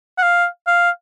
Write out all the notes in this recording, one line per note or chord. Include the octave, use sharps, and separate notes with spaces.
F#5
F5
F5